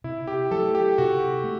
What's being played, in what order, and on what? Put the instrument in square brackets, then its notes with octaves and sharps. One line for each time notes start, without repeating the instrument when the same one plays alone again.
[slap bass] C3 [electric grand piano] E4
[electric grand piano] G4
[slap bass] F#3 A3 [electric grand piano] A4
[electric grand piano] G4
[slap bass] C3 [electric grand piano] F#4
[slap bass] A3